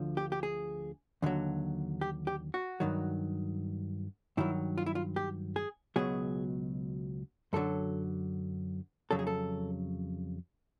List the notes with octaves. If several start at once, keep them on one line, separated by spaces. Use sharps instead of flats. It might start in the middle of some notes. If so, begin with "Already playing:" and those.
Already playing: D2 D3 F3
G4
G4
G#4
D#2 D3 F#3
G4
G4
F#4
G2 D#3 F#3
G2 D#3 F#3 E4
F4
E4
F4
G4
G#4
C#2 B2 F#3 G#4
F#2 D3 F#3 A4
F2 C#3 F#3 A4
G#4
A4